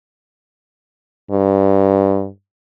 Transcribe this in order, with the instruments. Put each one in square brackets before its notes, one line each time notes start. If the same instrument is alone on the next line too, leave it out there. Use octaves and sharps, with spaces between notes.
[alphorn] G2